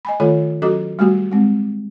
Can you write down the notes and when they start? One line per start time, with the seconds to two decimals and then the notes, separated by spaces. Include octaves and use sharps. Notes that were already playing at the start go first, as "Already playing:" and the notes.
0.05 D#5 G#5 B5
0.20 D#3 A3 F4 A4 C#5 B5
0.62 F#3 C#4 F#4 A4 D#5 D6
0.99 G3 A3 B3 F#4 G4
1.31 G#3 C4